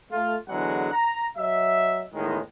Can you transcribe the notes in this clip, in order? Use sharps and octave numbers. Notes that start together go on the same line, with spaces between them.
A3 F4
E2 D3 F#3 G#3 F#5
A#5
F#3 D#5 E5
E2 A2 D#3 G#3